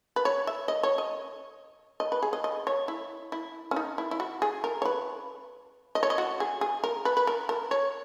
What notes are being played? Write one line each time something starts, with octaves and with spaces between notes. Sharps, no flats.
B4
C#5
E5
D#5
C#5
D#5
D#5
B4
G#4
D#5
D#5
C#5
E4
E4
C#4
D#4
E4
E4
F#4
G#4
A#4
C#5
B4
D#5
C#5
D#5
F#4
G#4
G#4
A#4
B4
B4
A#4
A#4
C#5